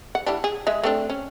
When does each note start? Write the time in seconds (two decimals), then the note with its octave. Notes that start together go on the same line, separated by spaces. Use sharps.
0.15 F#5
0.26 E3 G3 D4
0.44 G#4
0.67 G#3 G#4 E5
0.83 A3 C4 D4
1.10 C#4